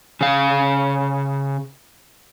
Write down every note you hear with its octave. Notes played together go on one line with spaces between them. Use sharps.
C#3 F5